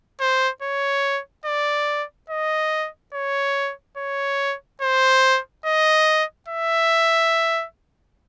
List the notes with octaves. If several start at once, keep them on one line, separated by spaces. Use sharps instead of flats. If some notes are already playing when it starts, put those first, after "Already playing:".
C5
C#5
D5
D#5
C#5
C#5
C5
D#5
E5